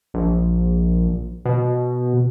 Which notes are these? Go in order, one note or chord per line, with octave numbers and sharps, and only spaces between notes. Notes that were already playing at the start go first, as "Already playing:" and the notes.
A#1
B2